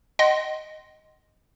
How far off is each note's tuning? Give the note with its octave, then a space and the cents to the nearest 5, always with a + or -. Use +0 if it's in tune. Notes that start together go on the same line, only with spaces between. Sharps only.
D#5 +0 F#5 +45 C6 +0